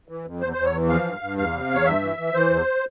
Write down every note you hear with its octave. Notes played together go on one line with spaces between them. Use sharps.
E3
F2
E2 C5
E2 C5
C#5
E3
F3 F5
G2
G2
E2 F5
C3
E2 C#5
G2 E5
E3
E3
E3 C5
E2